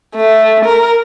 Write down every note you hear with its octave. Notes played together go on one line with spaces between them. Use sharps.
A3
A#4